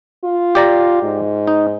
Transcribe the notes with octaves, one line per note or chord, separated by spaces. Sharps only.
F4
G4 D5 A#5
G#2
D#4